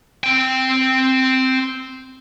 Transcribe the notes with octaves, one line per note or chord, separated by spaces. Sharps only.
C4 G5